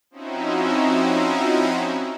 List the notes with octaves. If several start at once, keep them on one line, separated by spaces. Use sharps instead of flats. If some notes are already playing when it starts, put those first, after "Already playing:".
F3 C4 C#4 D#4 E4 F#4